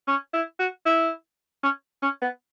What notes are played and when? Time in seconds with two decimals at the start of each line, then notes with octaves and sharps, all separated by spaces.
0.07 C#4
0.33 E4
0.59 F#4
0.85 E4
1.63 C#4
2.02 C#4
2.22 B3